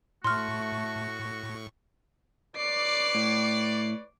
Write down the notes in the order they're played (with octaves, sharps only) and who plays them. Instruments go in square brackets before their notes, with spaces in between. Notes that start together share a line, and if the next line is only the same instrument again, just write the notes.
[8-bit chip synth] A2 C#6 [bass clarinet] A3 [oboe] F#4 [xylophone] C6 F6
[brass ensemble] B4 C#5 D5 [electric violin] D6 C7
[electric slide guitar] A2